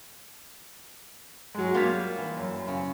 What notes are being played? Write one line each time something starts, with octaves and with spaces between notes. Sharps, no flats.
F#3 G#3
G3 A#3 F4 C#5 B6
E3
F#2
C#3